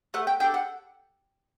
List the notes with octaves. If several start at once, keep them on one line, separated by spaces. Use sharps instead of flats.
A3 F#5
G5
D4 A4 G5
F#5